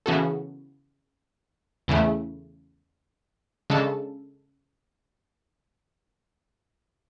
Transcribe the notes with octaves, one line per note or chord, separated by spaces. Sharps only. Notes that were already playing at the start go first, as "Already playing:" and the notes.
C#3 E3 B3 F#4 A4
E2 C#3 E3 A3
C#3 G#3 D4 A4